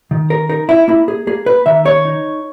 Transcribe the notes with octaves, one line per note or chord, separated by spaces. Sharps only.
D#3
A#4
D#4 A#4
E4
A#3 E4
G#4
A#3 G#4
B4
D#3 E5
C#5
D#4